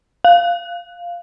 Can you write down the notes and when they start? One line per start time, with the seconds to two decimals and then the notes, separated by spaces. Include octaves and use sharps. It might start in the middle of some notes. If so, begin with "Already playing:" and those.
0.25 F5